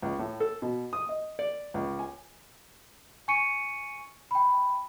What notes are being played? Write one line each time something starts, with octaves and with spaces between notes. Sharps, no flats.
C#2
A2
A4
B2
D#6
D#5
D5
C#2
G#5
G#5 C#6 C#7 D#7
G5 B5